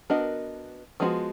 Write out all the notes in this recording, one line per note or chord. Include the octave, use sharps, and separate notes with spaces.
B3 D4 F#4 A#4 D#5
F3 G#3 B3 D#4 F#4